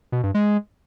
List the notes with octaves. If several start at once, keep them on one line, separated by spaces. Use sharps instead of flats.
B2
G2
G#3